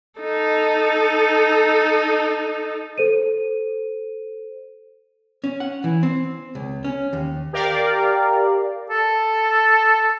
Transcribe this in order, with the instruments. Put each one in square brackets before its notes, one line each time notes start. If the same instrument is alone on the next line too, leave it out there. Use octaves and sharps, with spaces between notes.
[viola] D#4 A4
[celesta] A4 C5 D#7
[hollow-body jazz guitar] C#4
F#5
E3
C4
C#2
C#4
D#2
[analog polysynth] G4 A#4 D5 F5
[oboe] A4